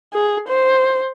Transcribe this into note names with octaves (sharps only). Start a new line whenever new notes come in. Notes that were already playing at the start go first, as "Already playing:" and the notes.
G#4
C5